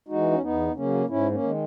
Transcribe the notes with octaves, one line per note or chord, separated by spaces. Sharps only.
E3 G#3 D#4 F#4
C#4
E2 B3 D#4
C#3 F#3 A#3 C#4
G#2 C#4 E4
A#3 C#4
D#3 G#3